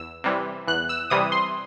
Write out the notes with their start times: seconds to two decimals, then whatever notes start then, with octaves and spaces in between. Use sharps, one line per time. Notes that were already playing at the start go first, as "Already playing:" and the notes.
Already playing: E2 E6
0.24 C3 E3 G3
0.67 E2 F#6
0.89 E6
1.10 C3 E3 G3 D#6
1.32 C6